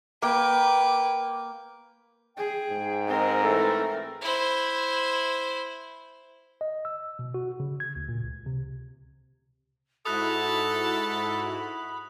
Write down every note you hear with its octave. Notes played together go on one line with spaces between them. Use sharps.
A#3 B4 G5
G#4 G5
G#2
G#3 C4 A#4
E3 A3 A4
E4 C5
D#5
E6
B2
F#4
C#3
G#6
D2
A#2
C#2
C3
G#2 E4 F#4 A4 B5 D#6 F#6